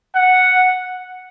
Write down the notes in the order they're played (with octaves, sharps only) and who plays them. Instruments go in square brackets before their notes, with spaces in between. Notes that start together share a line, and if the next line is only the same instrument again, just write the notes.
[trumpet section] F#5